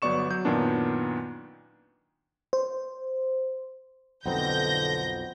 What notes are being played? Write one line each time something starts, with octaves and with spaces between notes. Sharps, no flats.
G1 F#3 B3 D5 C#6 E7
F#3 G6
F#2 A#2 D#3 B3 C#4 D4
C5
B1 F2 D3 B3 C4 D#4 G6 A#6